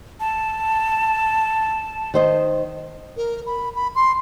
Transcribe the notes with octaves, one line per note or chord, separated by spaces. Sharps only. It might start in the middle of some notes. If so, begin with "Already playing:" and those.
A5
D#3 C5 D#5
A#4
B5
B5
C6